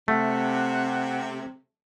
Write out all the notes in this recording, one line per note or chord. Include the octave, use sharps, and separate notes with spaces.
C3 A3 F#5